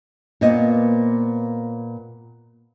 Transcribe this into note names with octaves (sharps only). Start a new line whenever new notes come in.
A#2 A#3 B3 C5 D#5